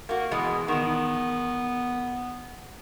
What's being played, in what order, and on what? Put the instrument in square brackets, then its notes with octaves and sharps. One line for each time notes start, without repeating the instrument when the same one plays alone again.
[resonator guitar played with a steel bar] A#3 F#4
B2 E3 G#3
[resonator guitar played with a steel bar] E2 D#3 [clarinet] B3